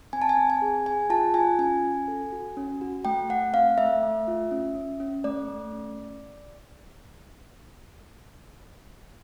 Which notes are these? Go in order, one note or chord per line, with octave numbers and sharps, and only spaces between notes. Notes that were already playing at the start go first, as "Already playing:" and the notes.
C4 G#5
A5
G#5
C4
G#5
G#4
G#4 G#5
F4 A5
F4 G#5
C#4 G#5
C#4
A4
F#4
C#4
F#4
A3 G5
A3 F#5
C4 F5
A3 E5
A3
F4
C#4
C#4
C#4
A3 D5
A3
C#4